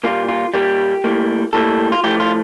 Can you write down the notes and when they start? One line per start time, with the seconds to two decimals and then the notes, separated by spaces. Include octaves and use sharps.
0.04 A#2 G3 A#3 F4
0.29 F4
0.54 A#2 G3 A#3 G4
1.04 A2 G3 A#3
1.53 A2 G3 A#3 A4
1.92 F4
2.04 A2 F3 A3 G4
2.20 F4